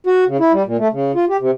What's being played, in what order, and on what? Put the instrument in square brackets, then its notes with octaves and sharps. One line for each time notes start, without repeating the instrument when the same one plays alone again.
[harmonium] F#4
C#3
E4
G3
A#2
A3
C#3
F4
G4
C3